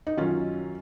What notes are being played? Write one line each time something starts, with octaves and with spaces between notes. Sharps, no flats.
D#4
F#2 D#3 F#3 C#4 F4